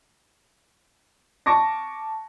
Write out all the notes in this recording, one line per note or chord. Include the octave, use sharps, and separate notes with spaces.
A5 C#6 D6 A#6